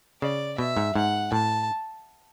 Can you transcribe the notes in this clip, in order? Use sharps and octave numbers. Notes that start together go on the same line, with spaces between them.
C#3 D5
B2 E5
G#2
G#2 F#5
A2 A5